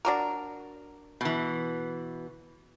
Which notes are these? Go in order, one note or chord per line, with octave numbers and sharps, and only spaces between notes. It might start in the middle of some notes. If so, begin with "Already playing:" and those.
D4 F#4 A#4
B2 E3